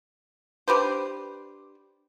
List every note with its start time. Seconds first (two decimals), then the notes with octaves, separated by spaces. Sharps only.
0.68 D4 G4 B4 C5